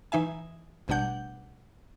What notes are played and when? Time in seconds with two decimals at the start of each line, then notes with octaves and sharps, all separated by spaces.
0.12 E3 D#4 E5 G#5
0.88 A1 B2 G3 D4 F#5 G6